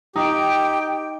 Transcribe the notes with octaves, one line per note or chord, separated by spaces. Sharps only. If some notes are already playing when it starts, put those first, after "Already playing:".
D#4 G4 G5